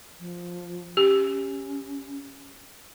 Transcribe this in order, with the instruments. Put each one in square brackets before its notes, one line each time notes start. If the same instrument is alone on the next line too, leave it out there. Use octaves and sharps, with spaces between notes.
[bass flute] F3
[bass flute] C#4 [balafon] G4